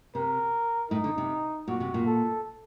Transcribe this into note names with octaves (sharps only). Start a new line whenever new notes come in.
C3 A#4
A2 D#4
D3
C3
A#2 F#4
C3
A#2
A4